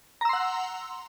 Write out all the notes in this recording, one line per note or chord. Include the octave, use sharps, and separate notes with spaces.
F#5 A#5 C6 E6